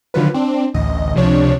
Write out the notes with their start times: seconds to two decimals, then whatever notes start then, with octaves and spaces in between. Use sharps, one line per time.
0.14 D3 D#3 F3 F#3 F4 B4
0.34 C4 D4
0.74 A1 D2 D#5
1.15 C#2 C3 F3 D4 C#5